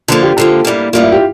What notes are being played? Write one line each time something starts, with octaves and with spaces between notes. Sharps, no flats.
D3 F3 A#3 A4
G4
D3 F3 A#3 A4
A2 G3 A#3
A2 G3 A#3 F4
E4
G4